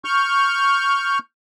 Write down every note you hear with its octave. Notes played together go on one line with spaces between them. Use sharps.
C#6 F6 G6